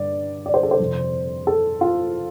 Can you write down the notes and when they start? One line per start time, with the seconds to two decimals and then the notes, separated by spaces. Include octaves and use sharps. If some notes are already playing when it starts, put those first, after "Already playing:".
Already playing: G2 D3 D5
0.46 D5
0.54 C5
0.63 A4
0.71 C5
0.80 F2 C3
1.47 A4
1.81 F4